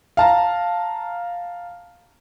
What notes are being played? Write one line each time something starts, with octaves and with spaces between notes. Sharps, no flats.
F5 A5 A#5